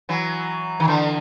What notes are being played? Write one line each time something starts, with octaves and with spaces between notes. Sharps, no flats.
E3 F#3
D#3
D3 E3